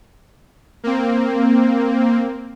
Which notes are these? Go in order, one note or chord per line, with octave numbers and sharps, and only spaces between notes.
A#3 C4